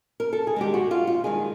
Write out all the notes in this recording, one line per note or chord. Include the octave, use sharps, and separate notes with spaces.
A#4
A4
G#4
G2 D#3 G#3 G4
F#4
F4
F4
G2 D#3 G#3 G#4